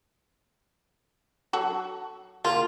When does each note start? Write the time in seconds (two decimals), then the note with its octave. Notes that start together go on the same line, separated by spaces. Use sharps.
1.53 F#3 F#4 A4
2.45 A#3 F4 C6